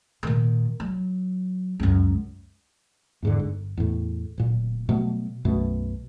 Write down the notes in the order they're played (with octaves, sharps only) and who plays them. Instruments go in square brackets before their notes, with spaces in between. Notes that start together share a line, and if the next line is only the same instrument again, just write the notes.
[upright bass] A#2 D#3
F#3
C#2 F#2
[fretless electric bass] E2 G#2 D3
G1
E2 A2
D1 A#2
B2 F#3 G3 A3
B1 F#2 B2 A3